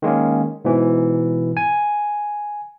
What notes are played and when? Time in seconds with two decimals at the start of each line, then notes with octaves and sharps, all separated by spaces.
0.02 D#3 G#3 A#3 C#4
0.65 G#2 B2 E3
1.57 G#5